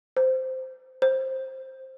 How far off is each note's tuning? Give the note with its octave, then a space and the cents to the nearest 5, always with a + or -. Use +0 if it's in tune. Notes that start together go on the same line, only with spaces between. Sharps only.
C5 -10
C5 +10